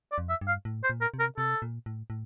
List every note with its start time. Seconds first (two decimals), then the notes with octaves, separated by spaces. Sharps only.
0.12 D5
0.18 F2
0.29 E5
0.41 G2
0.48 F5
0.65 A2
0.84 C5
0.90 A#2
1.01 A#4
1.14 C3
1.20 A#4
1.38 C3 A4
1.62 A#2
1.86 A2
2.10 A2